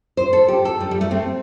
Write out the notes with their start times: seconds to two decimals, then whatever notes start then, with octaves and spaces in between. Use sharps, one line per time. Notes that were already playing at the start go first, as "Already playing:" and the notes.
0.17 C5
0.33 A4
0.48 G4
0.65 A4
0.81 G3
0.91 G3
1.01 A3
1.11 C4